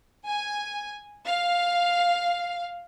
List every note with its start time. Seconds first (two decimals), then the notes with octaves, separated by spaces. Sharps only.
0.27 G#5
1.27 F5